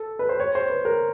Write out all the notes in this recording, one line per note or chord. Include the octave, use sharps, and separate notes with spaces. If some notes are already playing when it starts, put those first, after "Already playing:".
Already playing: A4
B4
C5
C#5
C5
B4
A#4